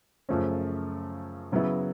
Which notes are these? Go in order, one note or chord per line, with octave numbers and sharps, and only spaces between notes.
F#2 C#3 F3 A3 C#4
C#3 F#3 B3 E4